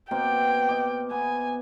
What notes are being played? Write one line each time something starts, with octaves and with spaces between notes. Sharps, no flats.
B2 A#3 C4 G5
D#5 D6
B3 G#5